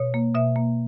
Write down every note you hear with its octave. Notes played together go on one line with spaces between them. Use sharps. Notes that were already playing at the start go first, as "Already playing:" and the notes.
Already playing: B2 C#5
A#3
B2 E5
A#3